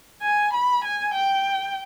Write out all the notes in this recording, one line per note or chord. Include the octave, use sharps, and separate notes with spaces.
G#5
B5
G#5
G5